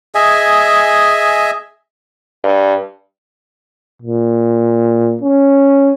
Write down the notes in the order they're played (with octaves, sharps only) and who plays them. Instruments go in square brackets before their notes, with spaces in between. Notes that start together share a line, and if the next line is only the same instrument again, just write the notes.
[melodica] G#4 D#5 E5 G#5
[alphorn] G2
[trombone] A#2
C#4